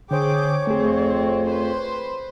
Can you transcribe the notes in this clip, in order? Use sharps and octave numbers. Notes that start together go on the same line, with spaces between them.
D3 G#4 C5 C#5 G5 D6
F2 A3 C4 G#4
B4 C5